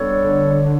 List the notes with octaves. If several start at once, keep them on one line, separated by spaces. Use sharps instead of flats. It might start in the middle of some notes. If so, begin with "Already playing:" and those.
Already playing: G3 B3 D4 A4 C#5
D3